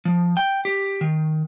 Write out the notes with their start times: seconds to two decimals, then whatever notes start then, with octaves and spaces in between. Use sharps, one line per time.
0.05 F3
0.37 G5
0.65 G4
1.01 D#3